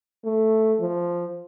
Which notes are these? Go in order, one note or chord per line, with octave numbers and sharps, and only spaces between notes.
A3
F3